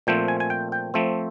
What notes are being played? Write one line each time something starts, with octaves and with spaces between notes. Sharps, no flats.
A#2 F3 A3 C4 G5
G#5
G#5
G5
G5
F3 A3 C4